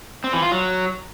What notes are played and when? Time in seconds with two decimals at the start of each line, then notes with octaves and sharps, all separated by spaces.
0.24 C4
0.33 E3
0.42 F4
0.52 F#3